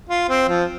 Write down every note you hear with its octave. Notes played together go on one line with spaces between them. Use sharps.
F4
C4
F3